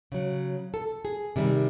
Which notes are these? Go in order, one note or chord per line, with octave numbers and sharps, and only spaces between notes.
C#3 F#3
A4
G#4
C3 D#3 G3